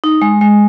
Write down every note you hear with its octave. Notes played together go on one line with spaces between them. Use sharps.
D#4
G#3
G#3